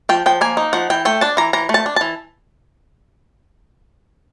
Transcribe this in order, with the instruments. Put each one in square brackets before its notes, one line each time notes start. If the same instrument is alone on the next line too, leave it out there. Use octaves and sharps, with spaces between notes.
[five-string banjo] F3 G5
F3 G5
A#3 G#5
D#4
F3 F#5
E3 G5
A3 G5
D4 A5
E3 A#5
E3 A#5
A3
A5
D4
E3 A5